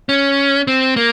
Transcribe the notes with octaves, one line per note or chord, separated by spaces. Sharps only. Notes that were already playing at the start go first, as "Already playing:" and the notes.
C#4
C4
A#3